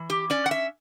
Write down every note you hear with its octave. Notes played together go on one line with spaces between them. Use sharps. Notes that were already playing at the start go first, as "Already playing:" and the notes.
Already playing: E3
G4
C#4 D5
F#5
E5